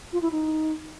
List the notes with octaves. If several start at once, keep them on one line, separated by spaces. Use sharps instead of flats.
F4
E4
D#4